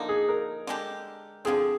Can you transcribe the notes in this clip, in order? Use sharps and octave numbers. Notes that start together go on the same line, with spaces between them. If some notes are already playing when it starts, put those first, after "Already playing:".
Already playing: D3 F3 A#3 D#4
G#4
A#4
D3 G#3 D4 G4
D3 F3 C4 G#4